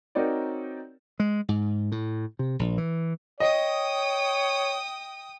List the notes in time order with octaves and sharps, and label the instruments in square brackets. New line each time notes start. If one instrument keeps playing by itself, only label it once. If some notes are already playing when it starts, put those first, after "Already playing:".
[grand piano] C4 D#4 F#4 A#4 C#5 D5
[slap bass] G#3
G#2
A2
C3
A#1
E3
[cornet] C#5 [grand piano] D#5 [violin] G5 D#6